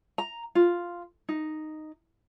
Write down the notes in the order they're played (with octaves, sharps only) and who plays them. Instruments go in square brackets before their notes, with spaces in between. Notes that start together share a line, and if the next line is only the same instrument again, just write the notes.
[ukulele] A#5
F4
D#4